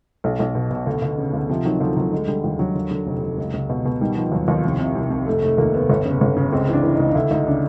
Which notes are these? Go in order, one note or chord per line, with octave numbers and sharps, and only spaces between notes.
B1
B1
B2
B2
D2
D2
C#3
D2
C3 F3
D#3 F#3
D2 F3
D2 F#3
D3 G#3
D3 G3
D#2 G3
D3 F#3
D3
D3
F1
F1
C#2
C#2
B2
B2
D#3 G3
D#3 F3
D#2 F#3
D#2 F3
C2 F3
C3
C2
C2
F1 A3
F1 A3
D#2 A#3
F1 B3
G1
C#3
G1
C#3
C#2 C4
E3 D4
E3
C#2 D#4
D#4
D2 E4
D2 D#4
C#3 D4